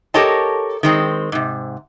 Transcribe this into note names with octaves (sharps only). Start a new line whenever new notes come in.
G4 A4 A#4 C#5 D#5 A5
D#3 G#3 C4
G#2 C3